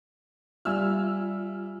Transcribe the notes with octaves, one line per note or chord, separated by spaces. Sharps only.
G3 F4 E5 G#5 E6 F6